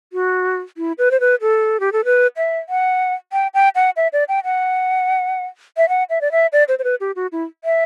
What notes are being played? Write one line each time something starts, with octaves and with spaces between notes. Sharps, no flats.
F#4
E4
B4
C5
B4
A4
G4
A4
B4
E5
F#5
G5
G5
F#5
E5
D5
G5
F#5
E5
F#5
E5
D5
E5
D5
C5
C5
B4
G4
F#4
E4
E5